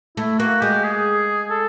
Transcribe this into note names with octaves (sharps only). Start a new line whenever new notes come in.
A3 E4
A#3 F#4
G#3 G4
G#4
A4